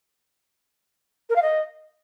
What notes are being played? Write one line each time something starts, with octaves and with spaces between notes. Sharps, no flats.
A#4
F5
D#5